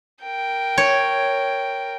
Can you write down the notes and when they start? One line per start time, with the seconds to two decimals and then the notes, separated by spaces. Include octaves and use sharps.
0.24 A#4 G5
0.78 C#5